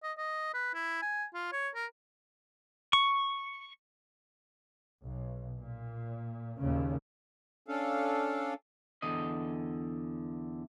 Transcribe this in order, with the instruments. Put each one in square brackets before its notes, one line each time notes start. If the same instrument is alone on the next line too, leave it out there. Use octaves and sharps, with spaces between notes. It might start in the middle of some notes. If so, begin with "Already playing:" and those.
[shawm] D#5
D#5
B4
E4
G#5
F4
C#5
A#4
[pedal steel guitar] C#6
[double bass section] B1
A#2
D#2 A#2 C#3
[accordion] C#4 D4 A4 F5
[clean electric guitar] E2 D3 D#5